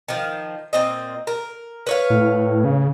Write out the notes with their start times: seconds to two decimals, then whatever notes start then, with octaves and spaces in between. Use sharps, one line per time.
0.08 D#3 F3
0.73 A#2 C4 D#5
1.27 A#4
1.87 B4 C#5 F5
2.10 A2
2.64 C#3